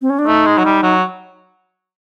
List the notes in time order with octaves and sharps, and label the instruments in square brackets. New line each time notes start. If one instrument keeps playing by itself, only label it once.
[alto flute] C4
C#4
D4
[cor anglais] A3 [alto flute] D#4
[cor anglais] G#3
F#3
G3
F#3